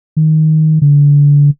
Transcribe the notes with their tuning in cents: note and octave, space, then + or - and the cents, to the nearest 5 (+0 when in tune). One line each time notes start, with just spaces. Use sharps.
D#3 +10
D3 -30